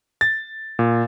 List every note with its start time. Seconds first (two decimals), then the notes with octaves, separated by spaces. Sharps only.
0.21 A6
0.79 A#2